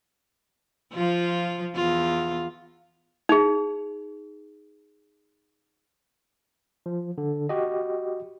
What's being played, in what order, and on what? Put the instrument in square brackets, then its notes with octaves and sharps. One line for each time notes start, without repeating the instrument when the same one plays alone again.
[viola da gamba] F3 F4
E2 F4
[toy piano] D#4 G#4
[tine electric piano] F3
D3
F#4 G4 D#5